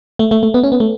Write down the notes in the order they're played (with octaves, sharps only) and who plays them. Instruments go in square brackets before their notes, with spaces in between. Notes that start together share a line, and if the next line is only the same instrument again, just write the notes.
[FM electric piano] A3
A3
A3
B3
C#4
B3
A3